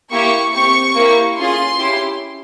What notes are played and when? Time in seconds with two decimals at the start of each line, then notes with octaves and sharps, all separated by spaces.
0.11 A#3 E4 G4 C#6
0.54 C4 G4 C#6
0.96 A#3 E4 G4
1.38 C#4 F4 G#4 C6
1.79 C#4 E4 G4